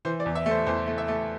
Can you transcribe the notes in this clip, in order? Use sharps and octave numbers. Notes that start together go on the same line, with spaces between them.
E3 C5
D5
E2
E5
A3
C5
E2 C5
A3
E5
A3